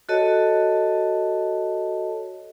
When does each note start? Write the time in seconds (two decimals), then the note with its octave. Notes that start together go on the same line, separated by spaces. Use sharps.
0.09 F#4 A4 C#5 D#5 A5